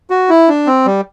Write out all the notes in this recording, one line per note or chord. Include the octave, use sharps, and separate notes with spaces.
F#4
E4
D4
C4
G3